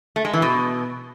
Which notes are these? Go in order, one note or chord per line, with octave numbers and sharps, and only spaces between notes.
A3
G#3
E3
B2